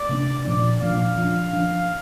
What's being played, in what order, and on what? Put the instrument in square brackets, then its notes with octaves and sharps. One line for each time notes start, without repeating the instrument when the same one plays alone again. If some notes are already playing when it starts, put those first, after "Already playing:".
Already playing: [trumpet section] D5
[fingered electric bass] C3 A#3 D4
[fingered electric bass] A#2 F3 A#3 D4 [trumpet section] D5
[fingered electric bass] A#2 F3 A#3 D4 [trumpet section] F5
[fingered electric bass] F3 D4
F3 D4